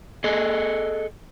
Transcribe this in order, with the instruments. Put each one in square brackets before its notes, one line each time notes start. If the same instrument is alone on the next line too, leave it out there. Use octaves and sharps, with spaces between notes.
[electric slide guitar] G#4 A4 D#5